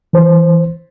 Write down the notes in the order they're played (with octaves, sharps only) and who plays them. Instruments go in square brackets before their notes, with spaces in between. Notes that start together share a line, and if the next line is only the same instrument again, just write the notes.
[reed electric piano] E3 C5